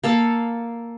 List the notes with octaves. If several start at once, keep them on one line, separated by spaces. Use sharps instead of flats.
A#3 A4 F5